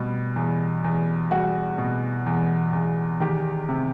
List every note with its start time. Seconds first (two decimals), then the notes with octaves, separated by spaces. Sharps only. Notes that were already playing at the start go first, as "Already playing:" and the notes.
Already playing: B2 G3
0.36 E2
0.84 E2
1.31 G3 F#4
1.78 B2
2.26 E2
2.73 E2
3.20 D#3 G4
3.69 C3